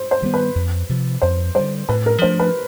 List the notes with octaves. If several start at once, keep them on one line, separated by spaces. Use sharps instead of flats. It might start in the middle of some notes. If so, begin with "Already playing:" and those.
Already playing: C5
C5
D#3 G3 B3
B4
F2
C3 F3
F2 C5
D3 G3 C5
A2 B4
A#4
F3 A3 D4 C5
B4